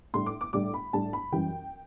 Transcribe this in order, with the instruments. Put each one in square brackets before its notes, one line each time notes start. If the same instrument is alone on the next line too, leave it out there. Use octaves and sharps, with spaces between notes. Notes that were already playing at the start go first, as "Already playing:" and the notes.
[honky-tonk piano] A2 G3 D4 C6
D6
D6
A2 G3 D4 D6
B5
A2 G3 D4 A5
B5
F#2 E3 G3 G5